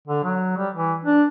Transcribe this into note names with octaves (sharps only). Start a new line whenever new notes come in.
D3
F#3
G3
E3
D4